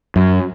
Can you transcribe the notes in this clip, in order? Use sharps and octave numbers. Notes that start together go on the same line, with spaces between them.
F#2